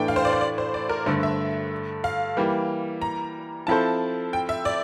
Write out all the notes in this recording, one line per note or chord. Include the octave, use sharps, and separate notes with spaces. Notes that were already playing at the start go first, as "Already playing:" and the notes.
Already playing: A2 E3 A3 D4 G5
F5
C5
D5
C5
D5
C5
D5
A#4
G2 D3 A3 C5
E5
F5
E3 G3 A#3
A#5
F3 C4 E4 A4 C5 A5
G5
E5
D5